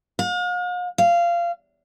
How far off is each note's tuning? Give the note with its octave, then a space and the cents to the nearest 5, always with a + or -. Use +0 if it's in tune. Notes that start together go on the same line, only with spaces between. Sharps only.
F5 +45
F5 -20